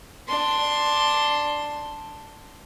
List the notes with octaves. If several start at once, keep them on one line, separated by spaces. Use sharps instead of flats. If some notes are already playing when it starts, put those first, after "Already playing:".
D4 C6